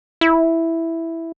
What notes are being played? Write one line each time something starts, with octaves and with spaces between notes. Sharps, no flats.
E4